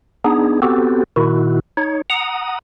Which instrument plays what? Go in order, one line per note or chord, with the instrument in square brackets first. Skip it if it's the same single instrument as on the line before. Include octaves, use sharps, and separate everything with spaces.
[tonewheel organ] B3 D4 D#4 G#4
B3 C4 F#4 G4 A4
A#2 D#3 E4 F#4
D#4 C#5
F#5 A#5 D#6